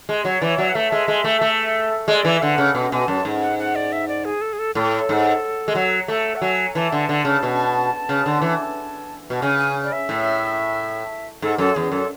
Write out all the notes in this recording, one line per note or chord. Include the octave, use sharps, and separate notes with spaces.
G#3
F#3 C#5
E3 D5
C#5
F#3 D5
F#5
A3 E5
G#3
G#3
A3
A3
G#3 D5
E3
E5
D3 F#5
C#3
B2
B2 G#5
F#2 A5
G#2
F#5
F#5
D5
E5
D5
G#4
A4
G#4
A4
A2 A4
G#2
G#3
F#3
A3 A4
F#5
F#3 G#5
E3 A5
D3
D3
C#3
B2
C#3
D3
E3
B2
C#3 G#5
G#5
D5
E5
A2
G#2 A4
F#2 A4
E2 G#4
F#2 A4